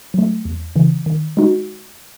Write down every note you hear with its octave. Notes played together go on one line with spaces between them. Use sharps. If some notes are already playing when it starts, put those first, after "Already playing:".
F#3 A3
E2
C#3 E3
D#3
G#3 D#4 F#4